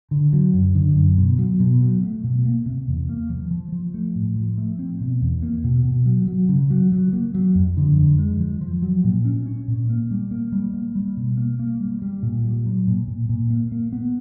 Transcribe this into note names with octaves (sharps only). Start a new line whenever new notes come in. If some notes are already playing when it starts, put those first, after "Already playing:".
D3
F#3
F#2
D3
F#2
B2
F#3
B2
F#3
A3
B2
A#3
C3
E2
A#3
F3
F3
F3
A3
A2
F3
A3
C4
B2
E2
A#3
B2
B2
F#3
F#3
C#3
F#3
F#3
A#3
F#3
F2
D3
F2
G#3
F3
F3
F#3
A#2
C#4
C#4
A#2
A#3
G3
A#3
G3
A#3
G3
B2
A#3
A#3
G3
G3
A#2
G3
F#3
A#2
A#2
A#2
A#3
A#3
B3